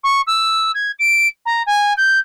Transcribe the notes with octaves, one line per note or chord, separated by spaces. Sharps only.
C#6
E6
G#6
D7
A#5
G#5
G6